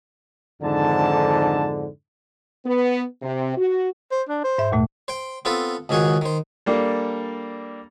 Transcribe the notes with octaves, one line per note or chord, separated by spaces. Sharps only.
F2 G#2 D3 D#3 D4 A5
B3
C3
F#4
C5
D4
C5
G#2 E5
D#2 A#2 A3
C5 G5
B3 C4 F4 A4 B4
C#2 G#2 D#3 F#4 G#4 F#5
D#3 C5
G3 A#3 D4 A4